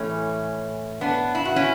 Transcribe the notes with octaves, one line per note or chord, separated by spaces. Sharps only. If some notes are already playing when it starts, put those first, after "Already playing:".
Already playing: A2 E3 A3 C#4
B3 D4
E4
F#4
C#4 E4